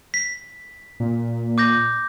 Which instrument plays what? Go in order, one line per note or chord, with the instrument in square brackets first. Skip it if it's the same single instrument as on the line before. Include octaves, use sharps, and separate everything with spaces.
[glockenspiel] B6
[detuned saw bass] A#2
[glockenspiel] D6 G6 A#6